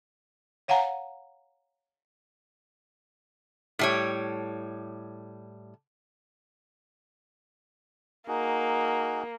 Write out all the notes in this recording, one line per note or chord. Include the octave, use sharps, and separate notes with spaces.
C#5 F5 F#5 G#5 A#5
A2 G3 C#5
A#3 D#4 F#4 G#4